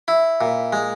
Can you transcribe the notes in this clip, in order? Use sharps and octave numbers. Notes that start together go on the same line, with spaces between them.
E4
A#2
G#3